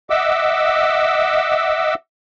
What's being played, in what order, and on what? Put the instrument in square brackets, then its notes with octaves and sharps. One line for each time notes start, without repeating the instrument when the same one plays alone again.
[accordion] D#5 E5 F#5 D6 E6